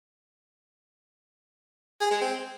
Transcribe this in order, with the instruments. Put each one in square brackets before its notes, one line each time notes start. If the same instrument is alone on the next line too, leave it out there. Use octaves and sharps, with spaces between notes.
[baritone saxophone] G#4
G#3
C4